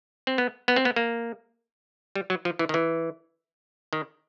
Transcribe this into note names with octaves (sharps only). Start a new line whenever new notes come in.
C4
B3
B3
C4
B3
A#3
G3
F#3
F3
E3
D#3
E3
D#3